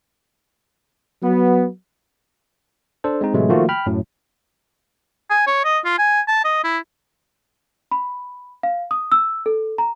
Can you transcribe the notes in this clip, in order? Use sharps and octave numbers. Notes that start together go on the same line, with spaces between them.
F#3 B3
D4 A4 C5
G#3 C4 D#4
A2 C3 E3 F#3 G#3 A3
D#3 F3 A3 A#3 F4 F#4
G5 B5 F6
F#2 A2 F#3
G#5
C#5
D#5
F4
G#5
A5
D#5
E4
B5
F5
D#6
E6
A4
A#5